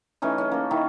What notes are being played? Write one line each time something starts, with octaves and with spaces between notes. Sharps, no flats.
E3 A3 C#4 D#4
C#4 G#4
A#3 A4
D#3 D#4 E4